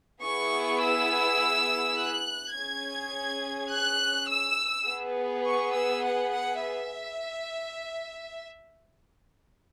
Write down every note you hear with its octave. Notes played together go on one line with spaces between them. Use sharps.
B3 E4 G#4 C#6
E6
F#6
C#4 G#4 G#6
F#6
E6
B3 G#4
C#6
E6
F#5
F#5
E5